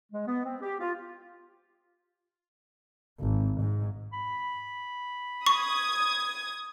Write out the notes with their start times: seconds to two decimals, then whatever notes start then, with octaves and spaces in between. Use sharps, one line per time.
0.12 G#3
0.27 B3
0.45 C4
0.61 G4
0.80 F4
3.20 G#1
3.61 G#2
4.13 B5
5.46 C#6 D#6 G#6